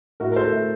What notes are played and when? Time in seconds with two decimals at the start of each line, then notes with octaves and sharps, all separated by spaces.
0.20 A2 F#4 A#4
0.32 A#4
0.36 A4 C5
0.52 A3